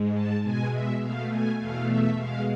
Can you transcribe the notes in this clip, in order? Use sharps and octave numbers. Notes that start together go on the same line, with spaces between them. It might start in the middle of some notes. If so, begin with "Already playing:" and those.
Already playing: G#2 G#3
A5
B2 G#3 G#5
E5
B2 A3 F5
G#5
E2 B2 A3 F5
E5
B2 G#3 F5